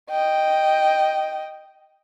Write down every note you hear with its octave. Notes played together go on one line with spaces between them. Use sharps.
D#5 G5